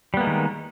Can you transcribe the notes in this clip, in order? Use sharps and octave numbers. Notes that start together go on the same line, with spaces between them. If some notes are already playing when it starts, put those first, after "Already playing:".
D#3 G3 G#3 A#3 B3